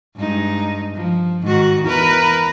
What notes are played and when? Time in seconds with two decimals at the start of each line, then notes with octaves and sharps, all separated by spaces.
0.16 G2 G#3 D#4
0.94 F3
1.42 G#2 D#3 F#4
1.84 E2 A#4 B4